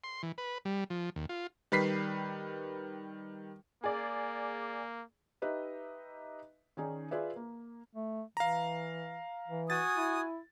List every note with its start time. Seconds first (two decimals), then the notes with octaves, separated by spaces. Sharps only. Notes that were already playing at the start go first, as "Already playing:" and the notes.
0.04 C6
0.23 E3
0.38 B4
0.65 G3
0.90 F3
1.16 D#2
1.29 F4
1.72 D#3 G3 B4 B6 C7
3.84 A#3 G#4 D5
5.42 D#4 G4 B4 D#5 E5
6.77 D#3 C#4 D#4 G#4 D5
7.11 F4 G#4 B4 D5 E5
7.36 A#3
7.94 A3
8.37 E3 F5 A#5
9.48 E3
9.70 F#4 G#5 D#6 A6
9.97 E4